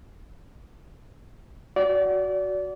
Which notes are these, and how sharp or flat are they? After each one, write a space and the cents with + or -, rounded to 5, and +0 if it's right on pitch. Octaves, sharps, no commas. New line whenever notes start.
F#4 +0 D5 -25